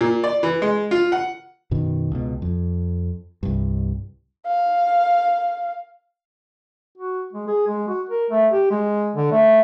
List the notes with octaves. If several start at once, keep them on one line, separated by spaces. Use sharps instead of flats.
A#2
D5
E3
G#3
F4
F#5
F#2 B2 D#3
C#2 B2
F2
C2 G2
F5
F#4
G#3
G#4
G#3
F#4
A#4
A3
G4
G#3
D3
A3